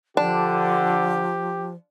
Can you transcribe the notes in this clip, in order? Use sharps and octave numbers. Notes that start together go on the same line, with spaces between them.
D3 F3 D4 G4